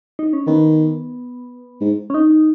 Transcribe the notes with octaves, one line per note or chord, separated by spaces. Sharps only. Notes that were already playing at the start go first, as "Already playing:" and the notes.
D#4
C#4
D#3 B3
G#2
C#4
D#4